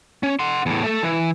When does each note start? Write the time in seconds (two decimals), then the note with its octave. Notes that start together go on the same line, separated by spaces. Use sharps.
0.23 C#4
0.39 F#5 C6
0.66 E2 A2
0.84 A3 A4
1.03 E3